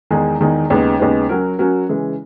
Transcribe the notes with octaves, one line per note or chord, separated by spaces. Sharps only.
E2 D#3 G#3 D#4 G#4
E2 D#3 G#3 D#4 G#4
D#2 C#3 G#3 B3 D#4
D#2 C#3 G#3 B3 D#4
F#3 C#4 F#4 A#4
F#3 C#4 F#4 A#4
C#3 E3 G#3